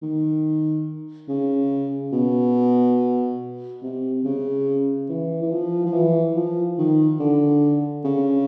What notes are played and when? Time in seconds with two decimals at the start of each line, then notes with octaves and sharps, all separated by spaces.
0.02 D#3
1.28 C#3
2.12 B2
3.82 C3
4.24 C#3
5.09 E3
5.42 E3
5.52 F3
5.86 F3
5.93 E3
6.36 F3
6.78 D#3
7.20 D3
8.05 C#3